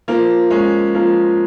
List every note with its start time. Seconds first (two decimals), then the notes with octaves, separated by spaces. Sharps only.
0.08 F3 A#3
0.50 G#3 C#4
0.94 F3 A#3